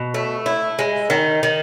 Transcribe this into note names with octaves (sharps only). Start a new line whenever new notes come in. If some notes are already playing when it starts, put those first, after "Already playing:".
Already playing: B2
A3
E4
G#3
D#3
D#3